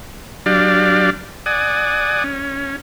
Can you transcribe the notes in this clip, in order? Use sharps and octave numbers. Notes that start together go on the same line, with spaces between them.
F#3 D4 G4 D5 F5
D5 F#5 G#5 D#6
C#4